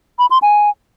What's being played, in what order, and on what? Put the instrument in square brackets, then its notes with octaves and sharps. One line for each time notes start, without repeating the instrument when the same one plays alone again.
[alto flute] B5
C6
G#5